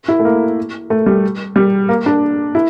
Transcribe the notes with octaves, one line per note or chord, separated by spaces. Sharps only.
E4
A3
A#3
A3
G3
G3
A#3
D4
E4